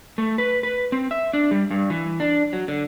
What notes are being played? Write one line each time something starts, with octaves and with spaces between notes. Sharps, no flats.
A3
B4
B4
C4
E5
D4
G3
G2
E3
D4
F#3
D3